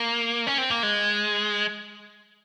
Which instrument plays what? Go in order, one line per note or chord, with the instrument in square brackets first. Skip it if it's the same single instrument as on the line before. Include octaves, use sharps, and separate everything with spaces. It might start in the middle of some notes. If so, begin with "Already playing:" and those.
Already playing: [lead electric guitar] A#3
C#4
C4
A#3
G#3